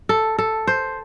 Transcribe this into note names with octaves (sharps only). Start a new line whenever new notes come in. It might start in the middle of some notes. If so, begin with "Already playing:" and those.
A4
A4
C5